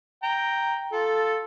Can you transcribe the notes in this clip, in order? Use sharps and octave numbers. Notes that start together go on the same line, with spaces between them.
G5 A#5
F4 A4